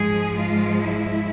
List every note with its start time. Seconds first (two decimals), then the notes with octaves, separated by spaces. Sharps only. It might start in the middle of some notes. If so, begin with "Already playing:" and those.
Already playing: G#2 F3 G#3 G#4
0.35 F4
0.81 E4